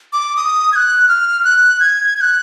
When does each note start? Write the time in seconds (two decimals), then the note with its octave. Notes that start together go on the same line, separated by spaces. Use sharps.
0.13 D6
0.37 D#6
0.72 G#6
0.76 F#6
1.08 F6
1.44 F#6
1.80 G#6
2.17 G#6
2.21 F#6